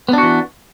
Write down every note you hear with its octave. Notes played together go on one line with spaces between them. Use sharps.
E3 B3 D4 F#4